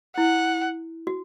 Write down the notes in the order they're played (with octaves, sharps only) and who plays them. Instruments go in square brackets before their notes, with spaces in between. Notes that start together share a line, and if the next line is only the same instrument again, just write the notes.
[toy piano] E4 [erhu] F#5
[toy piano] F#4